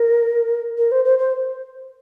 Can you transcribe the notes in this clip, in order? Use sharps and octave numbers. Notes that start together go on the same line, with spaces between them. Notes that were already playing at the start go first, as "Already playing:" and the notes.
Already playing: A#4
A#4
C5
C5
C5